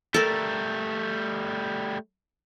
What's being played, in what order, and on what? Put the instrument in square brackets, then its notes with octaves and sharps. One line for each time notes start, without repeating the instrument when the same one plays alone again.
[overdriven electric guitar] G3 A3 [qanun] A4 A#4